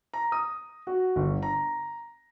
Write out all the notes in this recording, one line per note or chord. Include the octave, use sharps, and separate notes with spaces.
A#5
D#6
F#4
G1
A#5